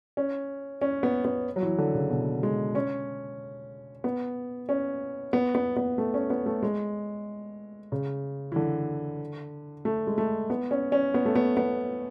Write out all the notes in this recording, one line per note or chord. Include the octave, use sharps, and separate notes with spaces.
C#4
C#4
B3
B3
F#3
E3
D3
C#3
B2
G#3
C#4
B3
C#4
B3
B3
B3
A3
C#4
B3
A3
G#3
C#3
E3
D3
A3
G#3
A3
B3
C#4
C#4
B3
A3
B3
B3